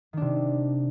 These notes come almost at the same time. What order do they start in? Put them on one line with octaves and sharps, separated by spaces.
D#3 D4 C3